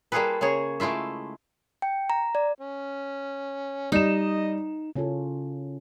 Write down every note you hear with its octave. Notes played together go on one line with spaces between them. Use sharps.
G3 A#3 F4 G#4 A4 B4
C#3 A#3 G#4 C#5
G#3 A3 E4 F4 E5
G5
A#5
D5
C#4
G3 D#4 D#5 E7
C#3 C#4 E4 F4 A4